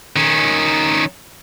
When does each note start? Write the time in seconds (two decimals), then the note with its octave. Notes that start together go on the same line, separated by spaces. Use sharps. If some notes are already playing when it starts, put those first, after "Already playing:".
0.16 D#3 C#4